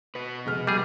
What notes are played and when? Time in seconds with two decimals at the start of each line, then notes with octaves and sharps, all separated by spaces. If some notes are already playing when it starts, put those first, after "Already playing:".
0.15 B2 B4
0.45 F1 G#3 F6
0.67 G3 G#4